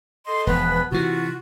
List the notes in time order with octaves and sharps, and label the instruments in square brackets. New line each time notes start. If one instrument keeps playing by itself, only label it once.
[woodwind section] A4 D#5 C6
[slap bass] E1 [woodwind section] F3 B3 B4
[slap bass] C3 E3 [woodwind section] F4 F#4